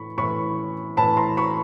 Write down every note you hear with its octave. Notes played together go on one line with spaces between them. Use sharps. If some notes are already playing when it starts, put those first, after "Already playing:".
Already playing: A2 E3 B5 C#6
A2 E3 B5 C#6
A2 E3 A5 B5
A#5 C6
B5 C#6